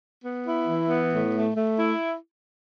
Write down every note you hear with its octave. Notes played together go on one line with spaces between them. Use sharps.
B3
E4
E3
B3
A2
A3
A3
E4